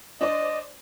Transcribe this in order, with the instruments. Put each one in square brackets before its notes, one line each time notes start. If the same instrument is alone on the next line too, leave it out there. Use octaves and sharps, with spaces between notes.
[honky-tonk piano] D4 C5 D5 [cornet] D#5